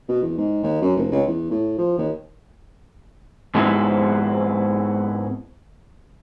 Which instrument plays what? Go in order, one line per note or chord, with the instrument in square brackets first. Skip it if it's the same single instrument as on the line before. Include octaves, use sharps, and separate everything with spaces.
[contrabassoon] B2
E2
G#2
D#2
F#2
F1
C#2
E2
A2
F3
D#2
[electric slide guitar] G#2 G#3 B3 C4 E4